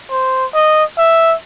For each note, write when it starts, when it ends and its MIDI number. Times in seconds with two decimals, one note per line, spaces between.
0.11 0.45 72
0.54 0.84 75
0.98 1.34 76